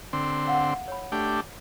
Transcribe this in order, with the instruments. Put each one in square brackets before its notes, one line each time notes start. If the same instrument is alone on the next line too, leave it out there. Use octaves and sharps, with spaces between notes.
[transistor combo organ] D3 C4
[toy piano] F5 F#5
C#5 B5
[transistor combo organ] A3 D4 G4